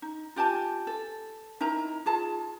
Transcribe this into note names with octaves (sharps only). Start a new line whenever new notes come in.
D#4
F4 G4 G#5 A5
A4
D#4 E4 A#4 A#5
F4 G#4 A5